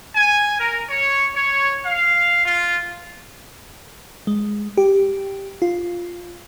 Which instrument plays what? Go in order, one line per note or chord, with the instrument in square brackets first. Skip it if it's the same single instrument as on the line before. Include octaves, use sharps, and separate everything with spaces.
[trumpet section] G#5
A#4
C#5
C#5
F5
F4
[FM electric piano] G#3
G4
F4